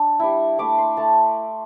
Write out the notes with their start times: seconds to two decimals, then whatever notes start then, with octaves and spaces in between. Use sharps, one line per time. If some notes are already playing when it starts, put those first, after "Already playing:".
Already playing: D4
0.20 G3 E4
0.58 A3 E4 D6
0.78 C6
0.97 A3 A5